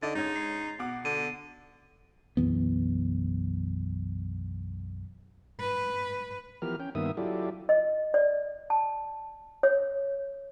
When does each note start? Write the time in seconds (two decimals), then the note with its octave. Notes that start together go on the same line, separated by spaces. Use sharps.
0.03 D3 D4 D#4 A6
0.15 G#2 C#4 D#4 G#6
0.36 C7
0.79 B2 F#5 D6
1.05 D3 D#7
2.37 B1 F#2 E3 B3
5.60 B4
6.62 E3 F3 B3 G4 A#4 F6
6.80 C#4 G5
6.95 G2 D#3 A#3 B3 E5 D#6
7.17 F#3 E4 F4 G4 A4 D5
7.69 D#5
8.14 D5
8.70 A5
9.63 C#5